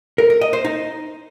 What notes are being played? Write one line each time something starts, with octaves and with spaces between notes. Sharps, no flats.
A#4
A#4
D#5
C5
D#4